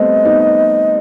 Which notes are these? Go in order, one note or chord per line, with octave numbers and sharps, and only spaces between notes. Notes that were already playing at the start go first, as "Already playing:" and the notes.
Already playing: G3 A3 B3 C4 D#5
B3 D#4